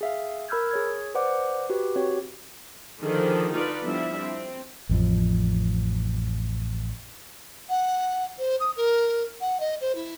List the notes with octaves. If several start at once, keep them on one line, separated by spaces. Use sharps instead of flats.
G#4 E5 F5
A#4 B5 E6 F6 G6 G#6
G#4 C#5 G#6
B4 C5 D5 F#5 D6
F#4 G4 B4
C4 F#4 G4 C#5
D3 D#3 F3 D4 G#4 A4
D#4 F4 A4 B4 D5
F3 G3 B3 D4 E4 E5
C4
A1 F2 F3
F#5
C5
D#6
A#4
F#5
D#5
C5
E4